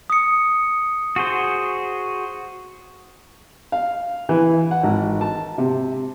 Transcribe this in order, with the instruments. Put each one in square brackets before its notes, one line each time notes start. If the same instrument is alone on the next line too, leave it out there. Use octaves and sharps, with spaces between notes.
[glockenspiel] D#6 C#7
[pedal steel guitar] F#4 G#4 C5
[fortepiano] F5
E3
F#5
G#1
A5
C3